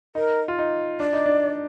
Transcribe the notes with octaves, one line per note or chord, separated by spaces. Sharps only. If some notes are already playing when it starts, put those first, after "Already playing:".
D#4 A#4
F4
D#4
D4 D5
D#4
D4